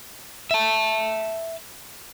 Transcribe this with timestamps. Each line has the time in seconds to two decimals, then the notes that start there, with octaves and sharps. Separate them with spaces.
0.51 E5 A5